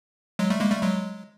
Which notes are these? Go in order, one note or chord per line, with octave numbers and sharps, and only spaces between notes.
F#3 G#3
G3 A3
G#3 A#3
G3 A3
F#3 G#3